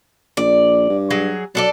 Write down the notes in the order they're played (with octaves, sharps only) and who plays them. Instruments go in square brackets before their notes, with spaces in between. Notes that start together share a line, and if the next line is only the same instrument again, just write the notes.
[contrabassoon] A#1 [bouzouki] D5
[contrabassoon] G2
[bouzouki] F#3 G#4
[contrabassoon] F#3 [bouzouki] D4 A4 D5